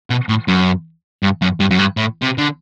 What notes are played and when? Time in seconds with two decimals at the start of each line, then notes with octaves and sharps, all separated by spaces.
0.10 B2
0.29 A2
0.48 F#2
1.23 G2
1.42 F#2
1.60 G2
1.71 F#2
1.79 G2
1.97 A2
2.22 C3
2.38 D3